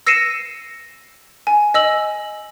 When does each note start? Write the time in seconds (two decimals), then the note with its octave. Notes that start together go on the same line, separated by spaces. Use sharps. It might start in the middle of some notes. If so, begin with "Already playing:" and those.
0.06 E6 A#6 C7 C#7 D#7 E7
1.47 G#5
1.74 D#5 E6 F#7